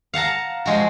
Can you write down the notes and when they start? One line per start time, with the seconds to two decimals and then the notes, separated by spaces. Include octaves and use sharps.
0.14 F5 F#5 A5 A#5
0.66 F3 G#3 F#4